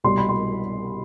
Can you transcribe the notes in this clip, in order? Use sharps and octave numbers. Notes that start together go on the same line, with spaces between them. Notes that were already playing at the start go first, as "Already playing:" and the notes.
C2 B2 G3 C6
B5
C6